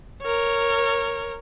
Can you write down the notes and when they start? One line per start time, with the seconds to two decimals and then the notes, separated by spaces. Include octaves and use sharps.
0.22 A#4 C#5